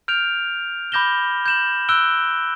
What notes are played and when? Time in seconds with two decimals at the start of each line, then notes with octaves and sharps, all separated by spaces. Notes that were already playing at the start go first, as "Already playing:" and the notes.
0.08 F6 G6 D7 F7
0.92 B5 D6 G6 A#6 E7 G7
1.46 G6 E7 F#7
1.89 E6 F#6 D7 G7